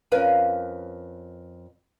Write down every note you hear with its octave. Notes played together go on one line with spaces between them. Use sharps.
F2 C#4 A#4 B4 F5 G#5